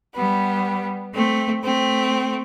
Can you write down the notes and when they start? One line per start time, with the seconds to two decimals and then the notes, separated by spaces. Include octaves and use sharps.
0.15 G3 B3
1.14 A3 C4
1.64 A3 C4